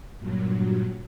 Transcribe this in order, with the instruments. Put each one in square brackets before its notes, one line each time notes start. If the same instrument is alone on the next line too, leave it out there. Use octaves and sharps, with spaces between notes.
[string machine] G2 A#2 F#3